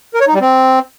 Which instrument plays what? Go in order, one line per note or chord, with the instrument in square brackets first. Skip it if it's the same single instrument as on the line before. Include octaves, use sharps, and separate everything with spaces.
[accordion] A#4
C#5
D#4
G3
C4